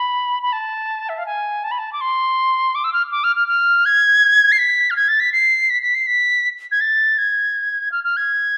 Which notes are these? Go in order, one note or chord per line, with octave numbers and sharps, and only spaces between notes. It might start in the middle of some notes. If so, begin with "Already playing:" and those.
Already playing: B5
B5
A5
E5
F5
G#5
A5
B5
A5
D6
C6
D6
E6
F6
D6
F6
F6
F6
G#6
C7
B6
F6
G#6
A6
B6
C7
B6
B6
C7
B6
G#6
A6
G#6
F6
F6
G#6